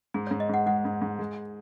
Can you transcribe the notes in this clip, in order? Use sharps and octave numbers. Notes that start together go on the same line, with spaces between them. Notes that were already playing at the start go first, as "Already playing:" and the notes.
G#2 G#4
G#2 C#5
D#5
G#2 F#5
G#3 F#5
G#2
G#2
G#3